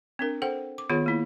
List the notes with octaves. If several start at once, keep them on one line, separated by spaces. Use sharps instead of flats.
C4 D4 A#4
A4 C5 F#5 G5
D6
D#3 B3 F4 G#4 C#5
A#3 E4